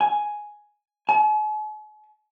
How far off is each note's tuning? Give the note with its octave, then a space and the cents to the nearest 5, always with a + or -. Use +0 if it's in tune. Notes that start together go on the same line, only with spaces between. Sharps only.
G#5 +5
G#5 +45